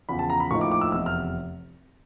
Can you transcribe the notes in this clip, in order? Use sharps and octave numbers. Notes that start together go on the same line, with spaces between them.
E2 C#3 F3 B5
A5
A#5
B5
A2 F3 A#3 D#4 C#6
D6
D6
E6
F1 E2 C3 E6
F6